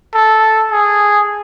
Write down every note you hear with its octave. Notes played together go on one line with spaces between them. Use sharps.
A4
G#4